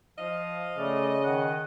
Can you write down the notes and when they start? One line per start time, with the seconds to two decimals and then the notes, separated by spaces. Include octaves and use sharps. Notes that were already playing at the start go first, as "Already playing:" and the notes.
0.18 F3 D#5 F5
0.78 C#3 A3 D5
1.24 D#3 F#5